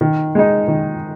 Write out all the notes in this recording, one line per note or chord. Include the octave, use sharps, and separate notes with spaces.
D#3
G#3 D#4
D#3